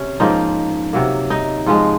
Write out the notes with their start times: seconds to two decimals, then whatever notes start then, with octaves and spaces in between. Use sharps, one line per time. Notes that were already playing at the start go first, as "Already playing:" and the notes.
Already playing: C3 F#3 C#4
0.20 G#2 F3 A#3 D#4
0.93 C3 F#3 A#3
1.30 D#4
1.66 G#2 F3 G#3